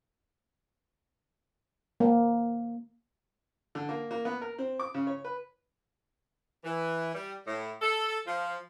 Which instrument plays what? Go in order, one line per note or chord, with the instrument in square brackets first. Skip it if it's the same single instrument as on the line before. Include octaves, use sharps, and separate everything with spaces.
[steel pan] A#3
[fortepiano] D3
A#3
A#3
B3
A#4
C4
D6
C#3
C#5
B4
[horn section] E3
G3
A2
A4
F3